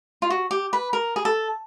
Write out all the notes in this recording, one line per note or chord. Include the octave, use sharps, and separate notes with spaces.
F4
F#4
G4
B4
A#4
G#4
A4